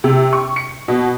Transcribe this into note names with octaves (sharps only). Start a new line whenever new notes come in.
C3
C#6
C#7
B2